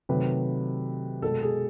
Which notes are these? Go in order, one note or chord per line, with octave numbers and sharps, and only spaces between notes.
C3 D#3 F#3 A3 B4
B2 G#3 A4
G#4